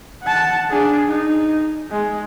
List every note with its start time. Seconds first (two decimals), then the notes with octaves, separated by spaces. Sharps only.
0.23 F#5 A5
0.70 D4 G#4
1.07 D#4
1.91 G#3